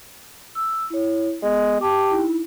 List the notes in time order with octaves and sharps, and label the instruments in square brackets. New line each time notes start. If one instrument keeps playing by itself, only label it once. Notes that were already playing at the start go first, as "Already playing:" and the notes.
[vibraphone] E6
E4 C#5
[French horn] G#3 [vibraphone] B3
[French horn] G4 [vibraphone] A5 D6
[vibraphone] D#4 E4